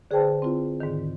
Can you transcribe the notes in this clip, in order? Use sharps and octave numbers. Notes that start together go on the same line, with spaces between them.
D3 G#4 B4 C5 G5 A5
C4 E4 F4
D#2 G#2 D3 D#3